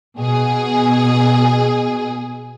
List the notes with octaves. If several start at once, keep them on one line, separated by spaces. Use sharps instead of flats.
B2 G#4